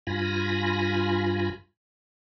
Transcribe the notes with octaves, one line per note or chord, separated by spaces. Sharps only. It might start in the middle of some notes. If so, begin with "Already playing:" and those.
G2 F4 G#5 B5 A#6